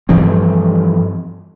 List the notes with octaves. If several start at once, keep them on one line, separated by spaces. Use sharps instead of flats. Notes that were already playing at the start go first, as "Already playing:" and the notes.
G2 E3 F3 C4